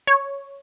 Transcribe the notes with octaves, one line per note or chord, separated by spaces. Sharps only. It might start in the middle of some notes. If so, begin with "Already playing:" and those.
C#5